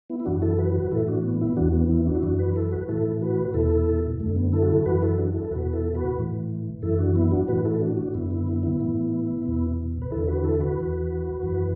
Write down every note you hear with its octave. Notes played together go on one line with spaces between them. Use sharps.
B3 E4
E4
F#2 E3 D4 F#4
E4 A4
F#4 B4
F#4 B4
A2 E3 E4 A4
D4 F#4
B3
B3 E4
E2 E3 D4 F#4
B3
B3 E4
D4 F#4
E4
F#2 E3 D4 F#4
F#4 B4
E4 A4
F#4 B4
A2 E3 E4 A4
F#4 B4
E2 B2 E4 A4
F#2 D3 A3
B3
E4 A4
F#4
E4 A4
F#2 E3 F#4 B4
E4 A4
D4 F#4
E4 A4
A4
E2 B2 F#4 B4
E4 A4
F#4 B4
A2 E3
F#2 E3 E4 A4
D4 F#4
B3 E4
D4 F#4
A2 E3 F#4 B4
E4 A4
D4 F#4
D4 F#4
F#2 D3 B3 E4
B3 E4
B3 E4
B3 E4
A2 E3
E2 B2
B4
E2 D3 E4 A4
F#4 B4
E4 A4
F#4 B4
E2 E3
F#2 E3